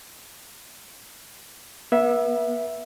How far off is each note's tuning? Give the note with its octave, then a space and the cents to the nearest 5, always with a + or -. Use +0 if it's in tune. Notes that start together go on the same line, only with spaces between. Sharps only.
B3 -40 E5 +0